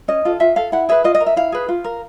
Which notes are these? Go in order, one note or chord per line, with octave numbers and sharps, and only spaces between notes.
C#4 D#5
F4 A4
F4 E5
A4 F5
E4 F#5
G#4 B4 E5
F4 D#5
D#5
A#4
E5
E4 F5
G#4 B4
F4
A#4